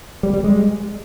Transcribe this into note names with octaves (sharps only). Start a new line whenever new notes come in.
G3
G3
G#3